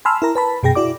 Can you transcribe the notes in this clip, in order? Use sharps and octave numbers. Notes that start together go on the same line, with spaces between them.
G#5 A5 B5 C6 E6 F6
E4 A#4 A#5
B4 A5 B5
F#2 B2 G#4 G5 A#6
E4 F#4 D5 D6